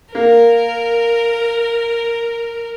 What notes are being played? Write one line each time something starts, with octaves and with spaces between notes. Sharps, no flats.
A#3 A#4